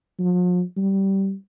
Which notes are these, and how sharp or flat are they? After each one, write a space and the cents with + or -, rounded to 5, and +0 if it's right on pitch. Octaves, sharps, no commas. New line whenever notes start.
F3 +45
G3 -15